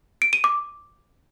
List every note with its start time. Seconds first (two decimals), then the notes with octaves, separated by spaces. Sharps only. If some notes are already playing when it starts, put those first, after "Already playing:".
0.22 D7
0.33 D#7
0.44 D6